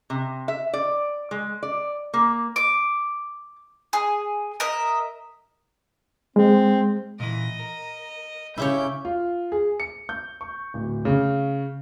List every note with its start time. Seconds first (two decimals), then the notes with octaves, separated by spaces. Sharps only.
0.10 C3
0.48 E5
0.73 D5
1.31 G#3
1.63 D5
2.14 A#3
2.56 D6
3.93 G#4
4.60 A#4 D#5 E5
6.36 G#3 C4
7.20 A#2 E3 D#5
7.59 A#4
8.58 C#3 E4 G4 C#5 G6
9.05 F4
9.52 G#4
9.80 C#7
10.09 G6
10.41 C#6
10.74 D1
11.05 C#3